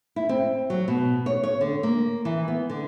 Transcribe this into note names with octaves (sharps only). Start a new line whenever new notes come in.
E4
C4
F#3
B2
C#5
C#5
D3
A#3
E3
B3
D3